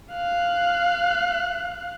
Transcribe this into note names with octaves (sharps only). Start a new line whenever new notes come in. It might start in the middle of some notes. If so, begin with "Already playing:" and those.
F5 F#6